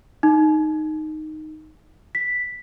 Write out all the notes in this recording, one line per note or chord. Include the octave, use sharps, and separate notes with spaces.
D#4
B6